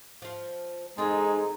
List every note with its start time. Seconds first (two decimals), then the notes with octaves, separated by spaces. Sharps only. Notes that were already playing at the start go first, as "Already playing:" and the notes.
0.22 F3 F4
0.98 E2 G#3 C4 D#4 G#4 A4